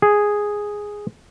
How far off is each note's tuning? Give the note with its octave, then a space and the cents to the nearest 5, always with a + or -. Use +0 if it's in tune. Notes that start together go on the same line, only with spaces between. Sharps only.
G#4 -5